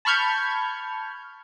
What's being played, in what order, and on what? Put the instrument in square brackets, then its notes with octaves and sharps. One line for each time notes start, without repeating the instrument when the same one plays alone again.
[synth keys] A5 B5 C#6 F6 G6 G#6